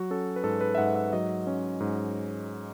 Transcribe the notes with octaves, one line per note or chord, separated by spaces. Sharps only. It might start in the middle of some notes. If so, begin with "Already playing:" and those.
Already playing: F#3 F#4
C#4 A4
B4
G#2 A4
B4
E5
G#2 F#5
E5
F#3 D#5
C#4
G#2